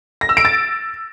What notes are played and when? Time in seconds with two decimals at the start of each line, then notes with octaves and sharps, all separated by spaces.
0.21 A#6
0.29 E6
0.37 D7
0.45 A6